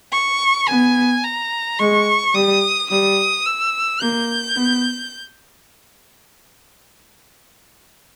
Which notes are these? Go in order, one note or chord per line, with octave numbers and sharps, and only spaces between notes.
C#6
B3 G#5
A#5
G#3 C#6
G3 D#6
G3 D#6
E6
A#3 G6
B3